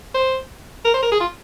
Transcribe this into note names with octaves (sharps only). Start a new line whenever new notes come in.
C5
A#4
C5
A#4
G#4
F4